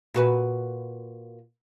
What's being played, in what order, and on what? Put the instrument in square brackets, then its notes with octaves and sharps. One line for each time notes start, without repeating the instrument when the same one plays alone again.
[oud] A#2 F#4 B4